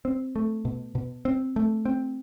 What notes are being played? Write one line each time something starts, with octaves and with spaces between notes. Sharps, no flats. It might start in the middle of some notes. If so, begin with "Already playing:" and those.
C4
A3
B2
B2
C4
A3
C4